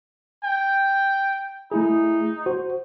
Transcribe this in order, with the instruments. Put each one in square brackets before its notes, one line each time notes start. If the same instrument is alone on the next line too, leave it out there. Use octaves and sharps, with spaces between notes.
[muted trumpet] G5
[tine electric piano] A3 E4 G#4 [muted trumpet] D#4
[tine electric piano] F#4 C5